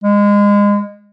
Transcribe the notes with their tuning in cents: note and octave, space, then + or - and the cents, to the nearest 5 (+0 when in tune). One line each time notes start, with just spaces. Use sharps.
G#3 -25